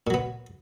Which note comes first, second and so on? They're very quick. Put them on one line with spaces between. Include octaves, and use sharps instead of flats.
A#2 F#3 B3